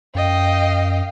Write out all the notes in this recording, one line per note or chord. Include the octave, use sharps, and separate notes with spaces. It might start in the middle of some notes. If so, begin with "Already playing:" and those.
F#2 D#5 F5 G5